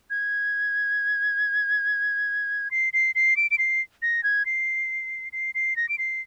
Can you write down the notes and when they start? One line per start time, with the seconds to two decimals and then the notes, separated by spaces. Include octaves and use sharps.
0.10 G#6
2.71 C7
2.93 C7
3.15 C7
3.37 D7
3.51 D7
3.58 C7
4.02 A#6
4.24 G#6
4.46 C7
5.33 C7
5.55 C7
5.76 A#6
5.89 D7
5.98 C7